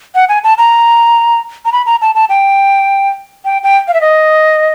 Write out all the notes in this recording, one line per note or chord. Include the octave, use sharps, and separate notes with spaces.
F#5
G#5
A5
A#5
A#5
B5
A#5
A5
A5
G5
G5
G5
F5
E5
D#5